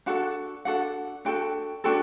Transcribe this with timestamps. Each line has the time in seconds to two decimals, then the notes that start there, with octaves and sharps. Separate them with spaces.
0.06 D4 F#4 A4 F#5
0.65 D4 F#4 A4 F#5
1.25 D4 F#4 A4 G5
1.84 D4 F#4 A4 G5